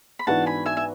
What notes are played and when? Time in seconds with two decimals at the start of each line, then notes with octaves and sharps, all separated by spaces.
0.19 B5
0.27 G#2 E3 B3 D4 F#4 F#5 A5
0.46 G#5 B5
0.66 E5 G#5
0.77 E5